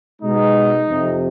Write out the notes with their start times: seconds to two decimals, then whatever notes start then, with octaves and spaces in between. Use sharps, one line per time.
0.21 B2 G#3 D#4
0.88 F2 C3 F3